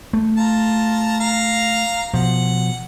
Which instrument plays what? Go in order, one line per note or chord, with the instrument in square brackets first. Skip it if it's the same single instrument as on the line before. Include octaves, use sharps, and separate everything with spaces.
[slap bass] A3
[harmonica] F4 A5 A#5
F5 A#5
[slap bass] B2 F3 [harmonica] F#5